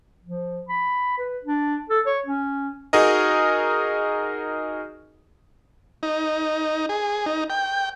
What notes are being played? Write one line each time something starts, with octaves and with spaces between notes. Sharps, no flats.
F3
B5
B4
D4
A4
C#5
C#4
D#4 F#4 G#4 A#4 D#5
D#4
G#4
D#4
G5